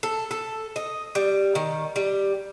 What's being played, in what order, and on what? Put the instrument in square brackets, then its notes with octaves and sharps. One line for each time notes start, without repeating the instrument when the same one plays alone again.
[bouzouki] A4
A4
D#5
G3
D#3
G3